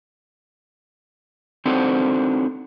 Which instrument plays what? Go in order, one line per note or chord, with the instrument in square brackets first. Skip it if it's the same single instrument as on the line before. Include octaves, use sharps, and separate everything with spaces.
[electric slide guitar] C4 D4 D#4 F#4 A4 C5